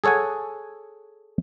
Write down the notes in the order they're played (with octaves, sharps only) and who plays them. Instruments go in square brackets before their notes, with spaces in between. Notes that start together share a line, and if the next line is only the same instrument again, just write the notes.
[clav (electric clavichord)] G#4 A4 C#5 F#5 G#5